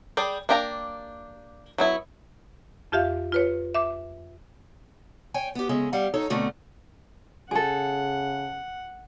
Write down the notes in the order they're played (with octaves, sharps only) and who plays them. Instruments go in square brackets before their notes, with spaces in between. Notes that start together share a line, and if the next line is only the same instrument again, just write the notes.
[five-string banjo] G3 G#4 D5 G5
A#3 D4 G4 D#5 A#5
F#3 B3 E4
[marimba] F2 F4 G4 E5 F5
F4 B4 C#5
E5 D6
[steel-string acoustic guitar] C#5 G5 G#5
B3 G4
C#3 G#3 A3 C#4
G3 F5 F#5
F#3 D#4 A4 C#5
B2 D3 A3 C4 C#4 A#4
[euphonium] C#3 [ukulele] G#4 A4 [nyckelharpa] F#5